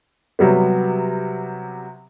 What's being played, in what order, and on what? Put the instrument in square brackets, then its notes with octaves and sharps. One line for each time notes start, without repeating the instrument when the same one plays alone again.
[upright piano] C3 F#3 G3 B3